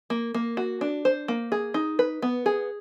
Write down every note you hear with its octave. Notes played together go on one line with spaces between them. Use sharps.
A#3
A#3
F#4
D4
C5
A#3
G#4
D#4
B4
B3
G#4